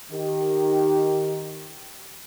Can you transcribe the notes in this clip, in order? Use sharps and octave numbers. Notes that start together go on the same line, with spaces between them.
D#3 G4